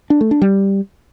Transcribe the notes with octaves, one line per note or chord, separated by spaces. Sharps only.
D4
A3
D4
G3